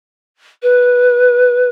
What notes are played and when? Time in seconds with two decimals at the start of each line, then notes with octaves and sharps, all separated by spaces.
0.63 B4